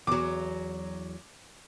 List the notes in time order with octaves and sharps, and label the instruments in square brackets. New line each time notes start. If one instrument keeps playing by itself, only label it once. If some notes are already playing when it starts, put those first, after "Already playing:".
[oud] E2 F#3 [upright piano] D6